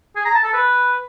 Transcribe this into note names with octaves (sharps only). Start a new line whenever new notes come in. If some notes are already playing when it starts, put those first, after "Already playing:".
G#4
A#5
A5
A4
B4